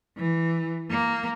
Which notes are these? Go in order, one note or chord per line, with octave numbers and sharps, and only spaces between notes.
E3
A#3